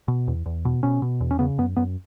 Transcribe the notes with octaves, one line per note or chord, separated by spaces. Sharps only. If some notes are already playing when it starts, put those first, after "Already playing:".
B2
E2
E2
B2
B2 C#4
B2
E2
C#4
C#3 B3
F#2 B3
F#2 B3